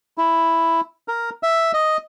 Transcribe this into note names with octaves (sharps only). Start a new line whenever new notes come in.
E4
A#4
E5
D#5